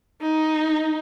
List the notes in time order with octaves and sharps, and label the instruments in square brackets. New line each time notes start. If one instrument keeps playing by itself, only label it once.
[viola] D#4